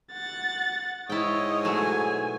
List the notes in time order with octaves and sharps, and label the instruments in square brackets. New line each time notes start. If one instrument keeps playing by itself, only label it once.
[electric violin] F#5 A6
[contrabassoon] G#2 [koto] E4 G5 [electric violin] C#5 D#5
[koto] B2 F#3 A3 [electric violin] G#5